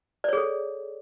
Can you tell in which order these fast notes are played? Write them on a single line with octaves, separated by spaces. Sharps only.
D5 C#5 G#4 A4